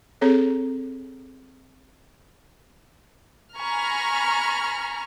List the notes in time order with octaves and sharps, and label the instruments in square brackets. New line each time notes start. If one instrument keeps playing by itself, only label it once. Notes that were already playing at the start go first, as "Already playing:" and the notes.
[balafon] C4 G#4 A4 C#5
[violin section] G#5 A#5 B5 C#6 F6